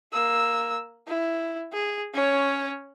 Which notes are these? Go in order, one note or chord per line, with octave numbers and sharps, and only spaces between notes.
A#3 E6
E4
G#4
C#4 C#5